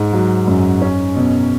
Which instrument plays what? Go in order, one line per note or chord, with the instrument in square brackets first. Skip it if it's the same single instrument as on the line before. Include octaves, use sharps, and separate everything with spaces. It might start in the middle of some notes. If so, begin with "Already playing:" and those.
Already playing: [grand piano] G#2
F#3
F#2
C#4
B2